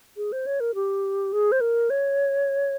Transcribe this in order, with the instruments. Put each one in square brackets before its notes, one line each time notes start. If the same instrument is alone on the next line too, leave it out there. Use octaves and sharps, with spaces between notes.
[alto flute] G#4
C5
C#5
A#4
G4
G#4
C5
A#4
C#5